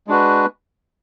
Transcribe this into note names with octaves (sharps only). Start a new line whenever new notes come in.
G#3 D4 F#4 B4